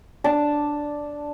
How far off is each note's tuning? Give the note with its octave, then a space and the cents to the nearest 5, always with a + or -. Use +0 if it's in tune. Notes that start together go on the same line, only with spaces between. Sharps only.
D4 +0 A5 +0